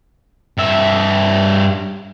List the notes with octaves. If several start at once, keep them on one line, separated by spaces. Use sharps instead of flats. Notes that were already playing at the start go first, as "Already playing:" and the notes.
G2 E5